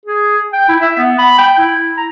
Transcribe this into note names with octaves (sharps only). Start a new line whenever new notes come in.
G#4
G5
E4
E5
B3
B5
G5
E4
A#5